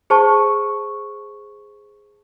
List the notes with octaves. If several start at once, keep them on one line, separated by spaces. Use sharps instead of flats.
G#4 C5 A5 C#6